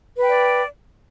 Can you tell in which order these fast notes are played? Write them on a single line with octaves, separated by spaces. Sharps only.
B4 G5 D5